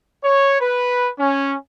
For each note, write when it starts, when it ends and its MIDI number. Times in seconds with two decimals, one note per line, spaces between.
0.23 0.60 73
0.61 1.10 71
1.19 1.55 61